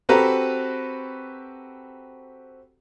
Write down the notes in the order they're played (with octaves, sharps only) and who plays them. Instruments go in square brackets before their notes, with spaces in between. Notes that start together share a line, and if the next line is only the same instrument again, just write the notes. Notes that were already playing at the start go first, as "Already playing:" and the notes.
[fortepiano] C4 F#4 G4 A4 B4 A#5